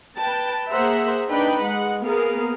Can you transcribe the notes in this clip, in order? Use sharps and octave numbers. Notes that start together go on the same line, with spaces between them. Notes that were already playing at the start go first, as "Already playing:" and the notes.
B4 G5 A5
A#3 G#4 C5 E5 F#5 A#5
D4 D#4 B4 G5
G#3 F#5
A#3 B3 G#4 A#4 F5